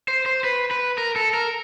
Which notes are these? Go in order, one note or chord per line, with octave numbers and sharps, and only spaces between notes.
C5
C5
B4
B4
A#4
A4
A#4